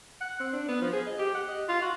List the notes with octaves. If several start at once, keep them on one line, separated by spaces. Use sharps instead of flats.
F#5
C4
D4
B3
F3
G#4
D#5
G4
F#5
D#5
F4
F#4